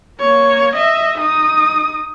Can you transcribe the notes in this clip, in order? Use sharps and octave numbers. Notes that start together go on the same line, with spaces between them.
A#3 C#5
D#5 E5
D#4 D#6